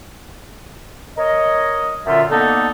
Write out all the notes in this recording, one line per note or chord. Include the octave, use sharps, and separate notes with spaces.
A#4 C#5 D#5
F#2 A#2 D3 F4 E5
D3 A#3 B3 D#4 A4